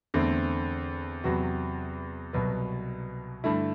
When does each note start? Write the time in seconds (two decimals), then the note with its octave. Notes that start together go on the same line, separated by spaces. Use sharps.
0.14 E2 D3 A3 C4
1.24 E2 C3 F#3 B3 F#4
2.33 C2 B2 F#3 B3
3.44 G2 D3 A3 E4